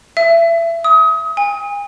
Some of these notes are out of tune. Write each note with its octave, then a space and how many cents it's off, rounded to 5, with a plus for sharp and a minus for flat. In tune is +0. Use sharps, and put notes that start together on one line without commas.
E5 +30
D#6 +30
G#5 -40